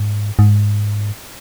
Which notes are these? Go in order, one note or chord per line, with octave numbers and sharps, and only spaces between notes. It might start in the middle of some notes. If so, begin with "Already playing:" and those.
Already playing: G#2
G#2